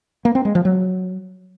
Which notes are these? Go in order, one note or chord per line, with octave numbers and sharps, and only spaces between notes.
A#3
C4
G#3
F3
F#3